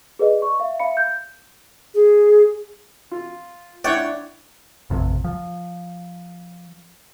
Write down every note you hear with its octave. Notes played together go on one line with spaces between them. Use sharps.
G#4 B4 D5 D#5
C#6
E5 F5
E5 F5 B5 C#7
G6
G#4
F4
D4 E4 C#5 D5 E5 F#5 G5
A1 F2 C3
F3